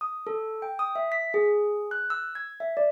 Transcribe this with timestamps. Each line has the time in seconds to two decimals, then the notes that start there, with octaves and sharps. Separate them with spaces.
0.01 D#6
0.27 A4
0.62 G5
0.79 D#6
0.95 E5
1.12 B6
1.34 G#4
1.91 F#6
2.10 E6
2.35 G#6
2.60 E5
2.77 D5